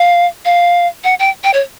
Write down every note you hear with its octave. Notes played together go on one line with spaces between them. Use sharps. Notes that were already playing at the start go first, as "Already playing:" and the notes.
Already playing: F5
F5
F#5
G5
G5
C#5